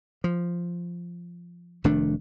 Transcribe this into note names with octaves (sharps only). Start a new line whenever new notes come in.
F3
F1 D#3 A3 D4